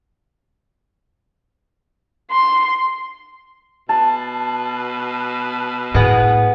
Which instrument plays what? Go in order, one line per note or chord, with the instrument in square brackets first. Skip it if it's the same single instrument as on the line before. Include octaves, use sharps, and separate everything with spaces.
[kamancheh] C6
[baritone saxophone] B2 [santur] A5
[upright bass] A2 [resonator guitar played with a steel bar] G#3 B3